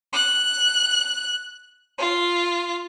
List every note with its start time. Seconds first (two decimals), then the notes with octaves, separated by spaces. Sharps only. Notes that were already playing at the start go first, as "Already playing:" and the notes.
0.13 F#6
1.98 F4